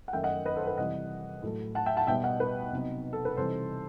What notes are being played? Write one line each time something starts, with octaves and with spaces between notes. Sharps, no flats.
F#5
F#2 D#3 A3 D#4 E5 G5
D#5 F#5
B4 D#5
A4 C5
B4
C3 E3 G3 D#5 F#5
A2 F#3 A3
F#5 A5
E5 G5
F#5 A5
B2 G3 B3 D#4 E5 G5
D#5 F#5
B4
C3 F#3 B3 D#4
A4
B4
C3 E3 G3 D#4 A4 C5